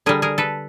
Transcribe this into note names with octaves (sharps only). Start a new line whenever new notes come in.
D3 G3 G#4 A#4
G#4 A#4
A4 B4